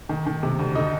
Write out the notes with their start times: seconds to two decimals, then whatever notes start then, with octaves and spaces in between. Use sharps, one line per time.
0.09 D#3
0.27 D#3
0.43 C3
0.59 D2
0.75 D3 D#4